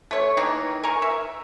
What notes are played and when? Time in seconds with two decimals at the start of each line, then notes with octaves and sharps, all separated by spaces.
0.11 A3 C#5
0.37 D#3 E3 A#3 D#4
0.83 A#4 G#5 A#5 C#6
1.02 E5